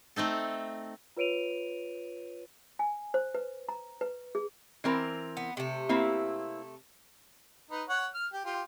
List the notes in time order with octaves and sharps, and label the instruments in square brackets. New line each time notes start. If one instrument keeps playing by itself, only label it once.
[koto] A3 C4 D#4 A4
[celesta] F4 B4 C#5 D7 D#7 F7
[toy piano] G#5
C5
B4
A#5
B4
G#4
[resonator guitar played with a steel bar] E3 C4 A#4
[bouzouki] B3
C3 A3
[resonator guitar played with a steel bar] A#3 C4 E4
[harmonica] D#4 B4
C#5 F#5
F6
G4
F4 G4